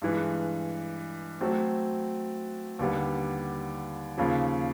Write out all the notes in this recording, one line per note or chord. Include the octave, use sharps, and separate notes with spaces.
G2 E3 G#3
F#3 A3 C4
D#2 D3 G3 B3
D#2 C#3 F3